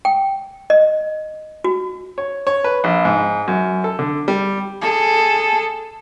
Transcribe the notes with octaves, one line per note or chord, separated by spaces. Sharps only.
G5
D#5
F#4
C#5
C#5
B4
A#1
G#2
F#2
A4
D3
G3
G#4 A4